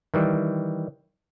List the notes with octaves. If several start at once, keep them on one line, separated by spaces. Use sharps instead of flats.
D#3 E3 G3